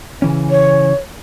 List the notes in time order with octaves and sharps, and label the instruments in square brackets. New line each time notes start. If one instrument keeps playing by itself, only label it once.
[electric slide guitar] C#3 E3 C#4
[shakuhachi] C#5